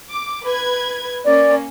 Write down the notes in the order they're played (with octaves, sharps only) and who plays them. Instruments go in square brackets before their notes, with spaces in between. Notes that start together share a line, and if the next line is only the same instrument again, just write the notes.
[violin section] D6
B4 G#6
[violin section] A#3 C#4 [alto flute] D5